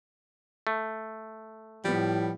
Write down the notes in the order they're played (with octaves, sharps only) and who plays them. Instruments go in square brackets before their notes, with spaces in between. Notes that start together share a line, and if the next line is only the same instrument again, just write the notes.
[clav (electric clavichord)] A3
[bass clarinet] A2 [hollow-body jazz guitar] F3 B3 [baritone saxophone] G3